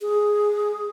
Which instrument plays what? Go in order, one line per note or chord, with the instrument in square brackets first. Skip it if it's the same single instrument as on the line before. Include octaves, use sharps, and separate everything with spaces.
[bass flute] G#4